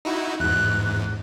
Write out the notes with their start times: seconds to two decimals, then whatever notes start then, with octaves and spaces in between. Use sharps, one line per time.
0.05 D#4 E4 F#4
0.40 E2 G#2 F#6